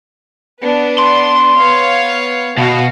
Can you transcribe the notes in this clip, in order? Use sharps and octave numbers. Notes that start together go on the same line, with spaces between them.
B3 D4 B4
C6
B3 C#5 F5
B2 F#4 F5